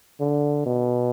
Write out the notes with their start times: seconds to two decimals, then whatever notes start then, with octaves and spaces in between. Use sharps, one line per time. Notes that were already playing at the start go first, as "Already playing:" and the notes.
0.20 D3
0.66 B2